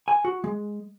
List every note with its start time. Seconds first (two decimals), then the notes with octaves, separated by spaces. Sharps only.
0.08 G#5
0.25 F#4
0.44 G#3